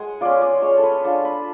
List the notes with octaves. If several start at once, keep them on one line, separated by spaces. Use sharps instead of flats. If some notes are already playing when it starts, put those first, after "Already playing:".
Already playing: G#3 F#5 G#5
C#4 F4 D5
D5
G#3 C#5
A4
B4
D4 F4 A5
B5